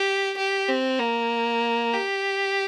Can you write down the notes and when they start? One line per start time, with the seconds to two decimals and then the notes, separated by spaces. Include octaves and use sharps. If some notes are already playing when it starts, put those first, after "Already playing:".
Already playing: G4
0.38 G4
0.69 C4
0.99 A#3
1.93 G4